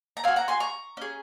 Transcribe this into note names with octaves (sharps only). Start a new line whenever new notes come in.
A#5
C4 F#4 F5 G#5
F#5 A#5
G#5 C6
A#5 C#6
C#4 G#4